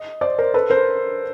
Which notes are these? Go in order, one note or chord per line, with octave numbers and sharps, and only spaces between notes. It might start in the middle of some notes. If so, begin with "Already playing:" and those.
Already playing: D#5
C5 D5
A#4 C5
A4 B4
A#4 C5